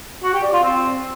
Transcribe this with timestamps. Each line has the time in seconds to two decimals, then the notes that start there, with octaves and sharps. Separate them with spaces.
0.23 F#4
0.33 G4
0.43 D5
0.53 F4
0.62 C4